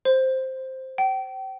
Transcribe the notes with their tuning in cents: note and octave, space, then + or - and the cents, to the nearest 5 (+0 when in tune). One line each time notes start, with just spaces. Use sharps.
C5 +5
G5 -35